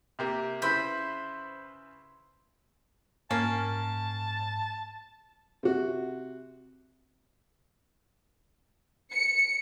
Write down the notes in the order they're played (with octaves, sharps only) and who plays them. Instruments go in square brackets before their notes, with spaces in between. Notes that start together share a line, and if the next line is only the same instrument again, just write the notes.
[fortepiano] C3 A#3 G4
[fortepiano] C#3 E4 B4 [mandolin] C5 B5
[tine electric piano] G#2 [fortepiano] A#3 [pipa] C#4 [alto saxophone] A5
[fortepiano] C3 F#4
[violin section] C#7